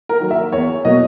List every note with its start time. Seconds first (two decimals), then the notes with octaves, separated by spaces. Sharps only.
0.09 A#4
0.20 D#3 F#3 A#3
0.31 E5
0.52 E2 C#5
0.85 B2 F#3 A#3 D#5